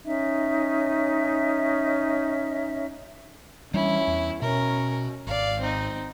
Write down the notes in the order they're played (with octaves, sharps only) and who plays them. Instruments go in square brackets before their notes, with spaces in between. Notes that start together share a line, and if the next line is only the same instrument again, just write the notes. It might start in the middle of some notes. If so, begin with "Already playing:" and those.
[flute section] C#4 D#4 D#5 E5
[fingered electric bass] E3 G3 D4 [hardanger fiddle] C#4 E4
[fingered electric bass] E2
[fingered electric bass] B2 [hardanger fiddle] C#4 A#4
[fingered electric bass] G#1 [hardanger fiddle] D5 F5
[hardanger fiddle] C4 D#4